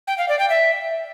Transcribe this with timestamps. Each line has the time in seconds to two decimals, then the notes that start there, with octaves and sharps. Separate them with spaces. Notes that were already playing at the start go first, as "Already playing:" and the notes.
0.07 G5
0.18 F5
0.29 D5
0.39 G5
0.50 E5